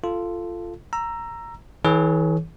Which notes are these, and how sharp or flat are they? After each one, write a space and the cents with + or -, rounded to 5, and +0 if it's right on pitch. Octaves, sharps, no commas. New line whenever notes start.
F4 -10 A4 +0
A#5 +0 E6 +20
E3 -35 G#4 +35 C#5 +0